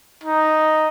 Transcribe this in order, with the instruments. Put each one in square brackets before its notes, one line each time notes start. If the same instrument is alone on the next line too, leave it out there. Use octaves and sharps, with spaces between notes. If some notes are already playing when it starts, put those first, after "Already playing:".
[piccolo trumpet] D#4